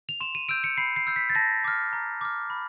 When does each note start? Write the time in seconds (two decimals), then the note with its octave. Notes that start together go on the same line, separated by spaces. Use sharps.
0.09 F7
0.20 C6 E7
0.35 D#7
0.49 E6 G6 D7
0.64 C#7
0.78 B5 C7
0.96 C7
1.07 E6 G6
1.16 B6
1.30 A6
1.35 A5 A#6
1.64 D6 F6
1.93 A#5
2.21 D6 F6
2.50 B5